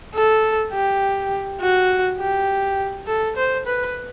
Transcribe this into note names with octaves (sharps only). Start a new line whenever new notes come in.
A4
G4
F#4
G4
A4
C5
B4